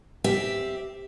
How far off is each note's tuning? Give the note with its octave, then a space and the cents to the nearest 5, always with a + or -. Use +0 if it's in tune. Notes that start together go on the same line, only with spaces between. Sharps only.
C4 +0 G4 +0 E5 +0